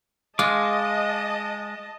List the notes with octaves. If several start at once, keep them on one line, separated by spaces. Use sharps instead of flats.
G#3 F4 D#5 A5 D6